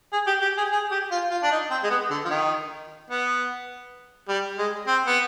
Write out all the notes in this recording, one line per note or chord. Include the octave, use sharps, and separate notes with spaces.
G#4
G4
G4
G#4
G#4
G4
F4
F4
D4
D#4
C4
G#3
B3
D3
F3
D#3
B3
G3
G#3
C4
B3